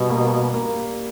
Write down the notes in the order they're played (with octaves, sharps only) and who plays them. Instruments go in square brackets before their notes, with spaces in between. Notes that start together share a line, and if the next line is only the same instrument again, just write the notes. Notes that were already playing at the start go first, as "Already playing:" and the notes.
Already playing: [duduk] B2 [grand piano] G3
[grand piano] A#3
A#3